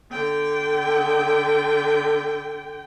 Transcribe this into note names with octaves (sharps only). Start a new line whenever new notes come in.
D3 G5